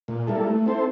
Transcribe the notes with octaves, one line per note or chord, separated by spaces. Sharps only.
A#2
G3 A#3 E4 A4
A3
C4 E4 A4 C5